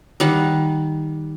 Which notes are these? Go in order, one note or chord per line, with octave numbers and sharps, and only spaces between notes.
D#3 G3 F#5